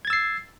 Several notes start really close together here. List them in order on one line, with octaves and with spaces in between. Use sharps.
G#6 A6 E6 C7